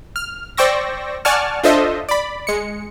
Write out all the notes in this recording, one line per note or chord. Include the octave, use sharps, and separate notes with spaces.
F6
C5 D5 G5 C#6 E6 A#6
D5 F#5 G#5 A5 C#6 F6
D4 F4 A4 C5 D#5 E5
D5 B5
G#3 C#7